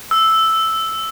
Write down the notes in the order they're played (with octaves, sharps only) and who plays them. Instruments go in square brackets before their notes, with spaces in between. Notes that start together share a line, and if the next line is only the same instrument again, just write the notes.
[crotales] E6